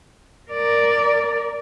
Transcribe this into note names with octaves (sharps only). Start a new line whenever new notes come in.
A#4 D5